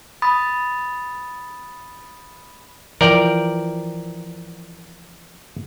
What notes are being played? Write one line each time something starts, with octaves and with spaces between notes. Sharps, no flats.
B5 D#6 A6
E3 F3 A#4 D5 G5